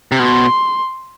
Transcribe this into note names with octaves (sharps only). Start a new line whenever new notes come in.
C3
B2 C6